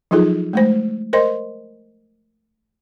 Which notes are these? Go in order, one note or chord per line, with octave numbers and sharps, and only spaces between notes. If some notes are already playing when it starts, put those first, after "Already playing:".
F3 F#3 D#4 F4 G#4 A4
G#3 A3 C5
A#4 C5 D#5 C6